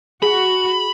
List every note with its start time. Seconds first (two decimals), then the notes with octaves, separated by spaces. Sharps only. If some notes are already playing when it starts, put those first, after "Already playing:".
0.22 F#4 G#4 B5